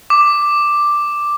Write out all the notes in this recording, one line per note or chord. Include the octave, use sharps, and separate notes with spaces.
D6